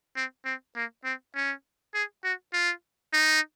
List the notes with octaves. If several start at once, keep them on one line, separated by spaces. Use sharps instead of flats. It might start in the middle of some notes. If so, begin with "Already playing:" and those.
C4
C4
A#3
C4
C#4
G#4
F#4
F4
D#4